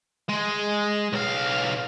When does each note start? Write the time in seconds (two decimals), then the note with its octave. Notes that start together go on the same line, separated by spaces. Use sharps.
0.29 G#3
1.13 B1 F5